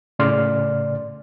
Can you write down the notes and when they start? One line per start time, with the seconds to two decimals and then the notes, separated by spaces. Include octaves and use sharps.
0.19 A2 C#3 D5 C6 F6